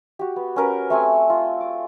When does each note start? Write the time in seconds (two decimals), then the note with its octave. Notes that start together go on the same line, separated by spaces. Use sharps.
0.19 F#4 G4
0.36 B3
0.56 C#4 A#4 B4
0.90 A3 C4 G#5
1.30 F4
1.60 D6